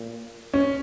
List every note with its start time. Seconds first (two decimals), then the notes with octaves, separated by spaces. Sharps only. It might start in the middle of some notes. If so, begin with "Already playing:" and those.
Already playing: A#2
0.54 C#4